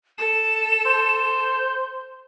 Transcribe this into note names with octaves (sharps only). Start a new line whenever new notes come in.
A4 E7
C5